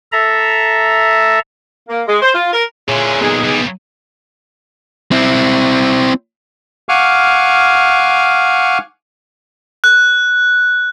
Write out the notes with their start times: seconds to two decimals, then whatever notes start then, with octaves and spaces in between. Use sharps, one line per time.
0.12 A4 E5 A#5
1.89 A#3
2.07 G#3
2.22 C5
2.34 F4
2.53 A#4
2.88 A#2 D3 E4 F4 G#4 C#5
3.22 B3 D#4 G#4
3.43 C#2 G3
5.11 C4 E4
6.89 F5 F#5 G#5 C#6 D6 F6
9.84 F#6